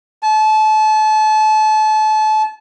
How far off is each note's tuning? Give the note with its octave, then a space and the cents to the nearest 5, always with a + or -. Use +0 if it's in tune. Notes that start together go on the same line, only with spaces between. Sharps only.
A5 -30